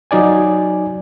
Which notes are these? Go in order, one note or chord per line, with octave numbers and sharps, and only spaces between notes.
F#3 D#4 D5 G#5